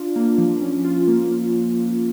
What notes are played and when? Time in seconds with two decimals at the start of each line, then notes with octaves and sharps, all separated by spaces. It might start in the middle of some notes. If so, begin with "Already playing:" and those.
Already playing: D4 F4
0.16 A#3
0.38 F3
0.62 C#4
0.84 F4
1.08 A#3